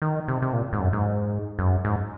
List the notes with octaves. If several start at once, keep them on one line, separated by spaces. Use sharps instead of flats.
D#3
C3
C3
A#2
G#2
F#2
G#2
F#2
G#2